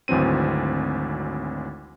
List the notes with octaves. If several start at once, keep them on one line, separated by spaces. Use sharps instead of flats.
G#1 D2 E3 F#3 C4 D#7